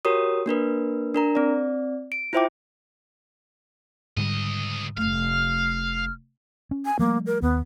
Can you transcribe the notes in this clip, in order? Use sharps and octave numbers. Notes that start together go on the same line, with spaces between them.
F#4 G4 A#4 C#5 D#6
A#3 D4 A#4 B4
D4 A#4 A#5
C4 D5
D7
E4 F4 C5 E5 G5 D6
C#2 G#2 D3 G3 D#5
F1 A3 F5 F6
C#4
G#5
F3 G3 A3 A#3
A#4
D#2 B3